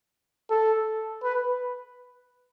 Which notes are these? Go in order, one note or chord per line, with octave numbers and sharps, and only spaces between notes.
A4
B4